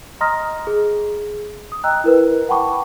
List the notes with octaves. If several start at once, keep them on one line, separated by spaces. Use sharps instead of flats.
D#5 A#5 C6 D#6 F6 A#6
G#4
D#6
D#5 G5 A#5 E6 F#6
E4 A#4 B4
F#5 G5 A5 B5 C#6 D6